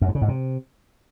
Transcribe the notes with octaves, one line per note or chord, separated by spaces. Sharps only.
F#2
G2
C#3
G#2
C3